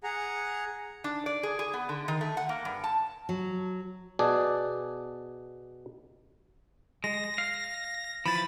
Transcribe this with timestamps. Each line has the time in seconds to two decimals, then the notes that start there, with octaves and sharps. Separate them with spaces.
0.03 G#4 F#5 A#5
1.04 D4
1.26 D5
1.43 G#4
1.59 G#4
1.73 B3
1.89 D3
2.08 D#3
2.21 A3
2.37 F#5
2.49 A#3
2.65 G2
2.84 A5
3.29 F#3
4.19 B2 G#4 D5 A5
7.04 G#3 A#6
7.38 F5
8.26 E3 F3 B5 A6